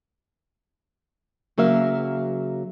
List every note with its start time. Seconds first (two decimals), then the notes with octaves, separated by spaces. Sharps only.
1.58 C#3 F#3 A#3 E5 F5